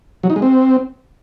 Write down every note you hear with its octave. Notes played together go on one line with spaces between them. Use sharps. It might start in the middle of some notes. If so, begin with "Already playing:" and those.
F#3
D#4
G#3
C4